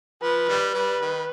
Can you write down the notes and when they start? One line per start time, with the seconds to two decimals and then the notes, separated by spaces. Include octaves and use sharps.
0.22 F3 B4
0.48 D#3 G3
0.74 G3 B4
1.01 D#3